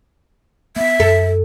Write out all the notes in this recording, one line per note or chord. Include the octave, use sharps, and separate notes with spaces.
A#3 B3 E5
F#2 A4